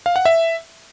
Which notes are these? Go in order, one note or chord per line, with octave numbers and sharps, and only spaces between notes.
F5
F#5
E5